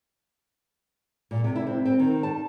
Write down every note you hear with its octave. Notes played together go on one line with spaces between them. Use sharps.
A#2
C3
E4
C4
C4
D#3
A5